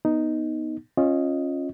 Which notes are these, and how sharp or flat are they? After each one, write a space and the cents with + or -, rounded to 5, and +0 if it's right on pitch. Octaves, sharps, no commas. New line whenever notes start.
B3 -10 D#4 +0
C#4 -20 F4 +0 D#5 +0